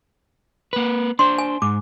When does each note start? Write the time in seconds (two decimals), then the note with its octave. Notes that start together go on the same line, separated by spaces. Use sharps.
0.73 A#3 B4
1.19 D4 C5 C6
1.38 G#5
1.62 G#2 D6